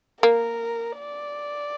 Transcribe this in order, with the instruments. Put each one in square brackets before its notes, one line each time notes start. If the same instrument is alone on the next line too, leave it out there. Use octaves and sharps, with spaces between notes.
[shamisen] A#3 [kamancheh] A#4
[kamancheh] D5